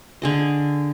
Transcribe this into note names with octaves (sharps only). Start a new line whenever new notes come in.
D3 G#4 D#5